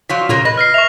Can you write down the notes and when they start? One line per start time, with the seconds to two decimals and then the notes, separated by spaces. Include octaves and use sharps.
0.09 F3 F#3 F4 B6
0.29 A#2 C#3 A#3 F4
0.45 B4 D#5 A#6
0.58 F6 A#6 C7
0.74 E5 C#6 F7